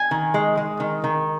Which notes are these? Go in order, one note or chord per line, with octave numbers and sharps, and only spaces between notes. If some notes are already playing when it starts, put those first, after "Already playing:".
Already playing: G#5
D#3
G#3
G#3
D#3
D#3